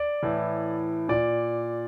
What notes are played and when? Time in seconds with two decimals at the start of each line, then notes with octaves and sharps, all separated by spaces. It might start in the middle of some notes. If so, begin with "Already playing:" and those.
Already playing: D5
0.23 A2 E3
1.09 A#2 D5